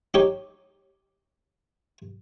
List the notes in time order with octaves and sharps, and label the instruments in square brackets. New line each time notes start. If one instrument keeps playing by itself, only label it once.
[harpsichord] D#4 G4 C#5